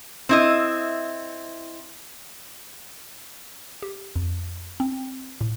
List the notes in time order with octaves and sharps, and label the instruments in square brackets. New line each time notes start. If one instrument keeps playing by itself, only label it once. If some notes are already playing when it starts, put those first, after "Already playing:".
[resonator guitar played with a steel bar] C4 E4 D#5
[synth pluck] G4
F2
C4
A2